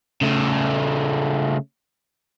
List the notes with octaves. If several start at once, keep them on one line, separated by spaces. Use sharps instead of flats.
C#3 A3